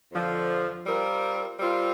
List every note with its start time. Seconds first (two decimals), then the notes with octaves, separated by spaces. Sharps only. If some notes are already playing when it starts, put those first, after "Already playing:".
0.12 F2 D3 F3
0.86 G3 C4 F4 A#4
1.59 G3 C4 F4 A#4